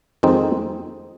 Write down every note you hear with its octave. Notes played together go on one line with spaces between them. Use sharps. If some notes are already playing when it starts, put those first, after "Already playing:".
F2 D#3 G#3 C4 D#4